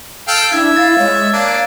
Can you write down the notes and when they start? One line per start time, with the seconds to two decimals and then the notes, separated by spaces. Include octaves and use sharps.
0.28 A4 F5 G5
0.52 D4 E4 E5 E6 G#6
0.77 F5 A6
0.99 G#3 C#5
1.33 A#3 D4 F5